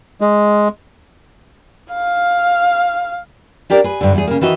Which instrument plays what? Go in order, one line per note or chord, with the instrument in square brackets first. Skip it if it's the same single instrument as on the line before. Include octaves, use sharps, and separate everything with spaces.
[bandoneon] G#3
[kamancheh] F5
[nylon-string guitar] D4 G4 A#4 D5
G#4 B4
G2 D3
E2 G#4
C#3 A#3
D#3 E3 F#4 D#5 E5